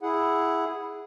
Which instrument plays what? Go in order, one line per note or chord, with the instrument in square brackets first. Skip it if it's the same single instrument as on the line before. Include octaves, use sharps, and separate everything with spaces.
[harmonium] E4 G#4 F#5